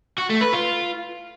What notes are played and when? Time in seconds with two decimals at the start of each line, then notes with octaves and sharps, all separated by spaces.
0.18 F#4
0.30 A3
0.42 B4
0.54 F4